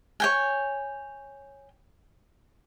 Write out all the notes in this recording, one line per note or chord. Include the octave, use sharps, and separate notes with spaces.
C#5 G5 G#5